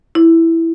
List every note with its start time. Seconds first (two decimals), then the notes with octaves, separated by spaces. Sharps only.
0.15 E4